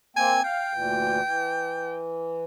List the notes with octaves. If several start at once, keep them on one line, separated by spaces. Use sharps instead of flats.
A#3 C4 G5 G#5
F5 G5
D2 A#2 E3
E3